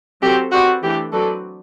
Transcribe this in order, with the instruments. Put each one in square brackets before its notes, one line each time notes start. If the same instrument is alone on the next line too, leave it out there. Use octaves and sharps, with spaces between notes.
[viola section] F#3 C4 F#4 A4 C5 [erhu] G4
[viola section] C4 G4 B4 D5 [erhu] F#4
[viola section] E3 A3 D4 [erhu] G4
[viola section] F#3 C4 F#4 B4 D5 [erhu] A4